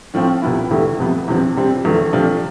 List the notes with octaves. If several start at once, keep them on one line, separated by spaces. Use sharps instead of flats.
A2 F3 C4 F4
C2 C3 F3 B3 E4
E2 D3 A3 E4 G4
F2 C3 F3 B3
E2 C3 F3 C4
C3 G3 C4
E2 D3 F3 A3
C3 F3 A3 D4 F4